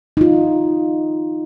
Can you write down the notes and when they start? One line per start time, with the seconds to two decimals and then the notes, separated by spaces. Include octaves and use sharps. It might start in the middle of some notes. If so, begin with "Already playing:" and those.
0.17 D#4 F4